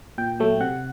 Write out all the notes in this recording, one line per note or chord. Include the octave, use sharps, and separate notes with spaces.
A#2 G5
F#3 A3
C3 F#5